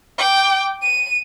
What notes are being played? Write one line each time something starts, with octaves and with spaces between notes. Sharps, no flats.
G5 D6
D#7